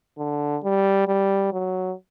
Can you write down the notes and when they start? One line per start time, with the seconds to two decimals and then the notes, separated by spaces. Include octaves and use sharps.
0.18 D3
0.63 G3
1.08 G3
1.53 F#3